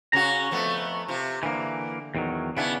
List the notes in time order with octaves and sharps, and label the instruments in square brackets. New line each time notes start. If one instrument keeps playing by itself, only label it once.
[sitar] C#3 C#4 F#4 [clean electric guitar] A#5
[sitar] F2 A3 B3
C3 F4
[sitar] D3 [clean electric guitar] E3 A#3
[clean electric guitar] E2 D#3 F#3
[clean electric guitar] C#3 B3 D4 [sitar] C#4 E4